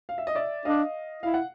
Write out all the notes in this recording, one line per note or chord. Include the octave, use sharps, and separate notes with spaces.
F5
E5
D#5
D5 E5
D4 D#5 F5
E4 F5
F#5